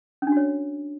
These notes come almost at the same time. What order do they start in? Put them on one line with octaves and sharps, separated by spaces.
C#4 D4 F#4 C#5